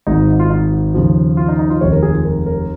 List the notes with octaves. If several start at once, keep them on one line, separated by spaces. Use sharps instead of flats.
G#1 G#2 G#3 D#4
F4
D#4
D#2 C#3 F3
F4
D#4
D#4
F4
F1 D#2 D#3 G#3 C#5
A#4
G#4
F4
A#4
A#4